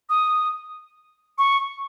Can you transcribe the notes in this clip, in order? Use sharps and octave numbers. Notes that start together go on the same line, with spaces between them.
D#6
C#6